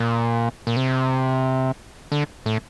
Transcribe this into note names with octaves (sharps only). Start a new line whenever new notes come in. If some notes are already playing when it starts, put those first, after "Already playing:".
Already playing: A#2
A#2
C3
D3
A2